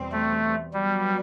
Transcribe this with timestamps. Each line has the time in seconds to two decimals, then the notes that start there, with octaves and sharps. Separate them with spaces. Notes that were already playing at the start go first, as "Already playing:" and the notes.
Already playing: E2 B2 G3 C4
0.12 A3
0.73 F#3 G3 B3 F#4